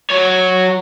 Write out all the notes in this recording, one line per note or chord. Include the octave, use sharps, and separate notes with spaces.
F#3 C#5